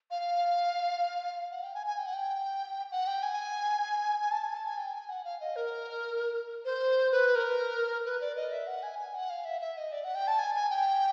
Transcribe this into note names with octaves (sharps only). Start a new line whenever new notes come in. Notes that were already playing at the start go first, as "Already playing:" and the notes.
F5
F#5
G5
G#5
G#5
G5
F#5
G5
F#5
G5
G#5
G#5
A5
G#5
A5
G#5
G5
G#5
F#5
F5
D#5
A#4
C5
B4
A#4
B4
D5
D#5
E5
F#5
G#5
G#5
F#5
F5
E5
E5
D#5
D5
F#5
G5
A5
G#5
G#5
G5